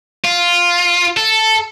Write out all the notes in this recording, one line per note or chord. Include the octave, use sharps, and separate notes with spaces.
F4
A4